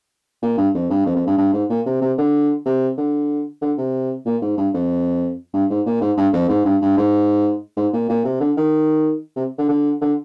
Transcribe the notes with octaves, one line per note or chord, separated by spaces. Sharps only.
A#2
G2
F2
G2
F2
F2
G2
G2
G#2
A#2
C3
C3
D3
C3
D3
D3
C3
A#2
G#2
G2
F2
G2
G#2
A#2
G#2
G2
F2
G#2
G2
G2
G#2
G#2
A#2
A#2
C3
D3
D#3
C3
D3
D3
D3